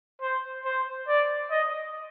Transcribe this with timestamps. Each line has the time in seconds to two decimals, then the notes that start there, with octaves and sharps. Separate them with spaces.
0.22 C5
0.65 C5
1.08 D5
1.51 D#5